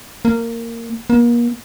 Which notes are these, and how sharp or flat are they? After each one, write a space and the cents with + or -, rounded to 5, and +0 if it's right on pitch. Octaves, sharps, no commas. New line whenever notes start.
A#3 -15
A#3 +35